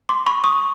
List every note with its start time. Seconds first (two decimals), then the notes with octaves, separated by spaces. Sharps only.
0.09 C6 D6
0.26 B5 C#6
0.44 C#6 D#6